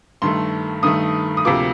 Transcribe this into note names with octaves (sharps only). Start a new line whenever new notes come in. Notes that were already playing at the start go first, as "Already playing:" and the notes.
G2 D#3 A3 C6
G2 D#3 A3 D#6
D#6
D2 C3 F3 A#3 D6